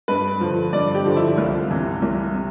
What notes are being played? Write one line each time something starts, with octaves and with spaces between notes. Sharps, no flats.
G2 B4
D3 F3
G2 D5
G4
D3 F3
E4
C2 F4
C3 E3
C2
C3